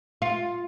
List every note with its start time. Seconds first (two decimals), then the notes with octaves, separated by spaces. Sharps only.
0.22 F4